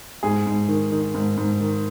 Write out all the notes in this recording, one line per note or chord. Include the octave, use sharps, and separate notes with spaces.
G#2 G#4
G#2
D#3
D#3
G#2
G#2
D#3